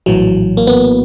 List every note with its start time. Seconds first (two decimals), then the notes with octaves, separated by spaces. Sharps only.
0.06 A#1 A2 E3 F#3
0.57 A#3
0.67 B3